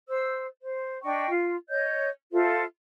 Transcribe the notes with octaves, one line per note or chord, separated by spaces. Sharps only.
C5 E6
C5
D4 D#5 G5 C#6
F4
C#5 D#5 G6
F4 A4 C5 E5